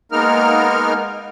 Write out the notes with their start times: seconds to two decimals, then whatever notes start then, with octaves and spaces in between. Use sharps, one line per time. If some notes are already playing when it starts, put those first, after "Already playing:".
0.12 G#3 A#3 B3 D#4 A#4 F6